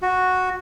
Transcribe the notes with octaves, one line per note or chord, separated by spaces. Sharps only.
F#4